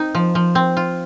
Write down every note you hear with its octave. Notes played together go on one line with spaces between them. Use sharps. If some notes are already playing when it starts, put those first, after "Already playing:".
Already playing: C4 D#4
F3
F3
C4
F4